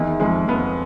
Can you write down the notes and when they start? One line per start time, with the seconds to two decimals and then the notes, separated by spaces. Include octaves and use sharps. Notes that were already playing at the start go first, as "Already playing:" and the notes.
Already playing: E2 D#3 E3
0.20 F2 F3 G#3
0.48 F2 F3 B3